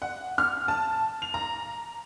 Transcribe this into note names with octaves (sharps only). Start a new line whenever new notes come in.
F#5
F6
A5
F7
A#5